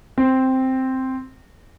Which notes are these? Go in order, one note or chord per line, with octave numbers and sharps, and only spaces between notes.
C4